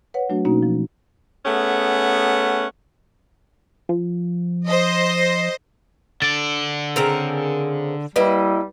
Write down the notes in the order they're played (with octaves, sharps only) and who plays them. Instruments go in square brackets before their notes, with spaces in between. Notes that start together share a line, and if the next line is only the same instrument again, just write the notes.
[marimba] B4 C#5 F#5
F#3 A3 D4 F#4
B2 A#3 C#4 D#4 F#4
F3
[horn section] A3 B3 C#4 G#4 F#5
[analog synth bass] F3
[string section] C5 D#5
[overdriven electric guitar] D3 D5 [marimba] A6
[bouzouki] C#3 C4 A#4
[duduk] G3 [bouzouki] A#3 E4 D#5 [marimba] B4